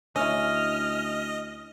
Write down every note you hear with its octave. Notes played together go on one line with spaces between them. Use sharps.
D2 C#4 E4 D#5 F6